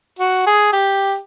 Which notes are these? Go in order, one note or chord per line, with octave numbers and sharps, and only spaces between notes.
F#4
G#4
G4